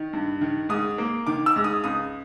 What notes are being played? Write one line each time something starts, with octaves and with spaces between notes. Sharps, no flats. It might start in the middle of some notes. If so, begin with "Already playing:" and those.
Already playing: D#3
G2
D#3
G#2 D#6
A#3
D#3 D6
E6
G#2
D#6
C#2 D#6